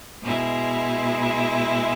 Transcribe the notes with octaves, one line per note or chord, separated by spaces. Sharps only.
B2 G#3 E4